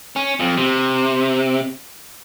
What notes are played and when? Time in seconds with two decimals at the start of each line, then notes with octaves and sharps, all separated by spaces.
0.16 C#4
0.40 F2
0.58 C3